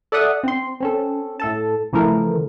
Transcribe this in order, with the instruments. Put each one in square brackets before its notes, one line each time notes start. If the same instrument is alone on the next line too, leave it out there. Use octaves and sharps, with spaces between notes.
[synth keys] A4 D5 E5 F#5 D#6
C4 C6
C4 C#4 A4
A2 A4 A5
C#3 E3 F3 A3 A#4